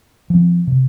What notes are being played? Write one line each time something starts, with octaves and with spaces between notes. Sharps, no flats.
F3 C4
C3